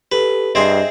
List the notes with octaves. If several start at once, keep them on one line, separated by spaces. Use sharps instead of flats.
G4 A4 B4
G2 C4 G#4 C5 D#5 E5 C7